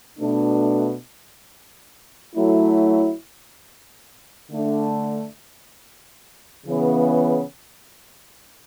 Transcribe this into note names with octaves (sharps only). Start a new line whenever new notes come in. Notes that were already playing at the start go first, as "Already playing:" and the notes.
B2 A3 D4
F#3 A3 E4
D3 A3 D4
C#3 E3 B3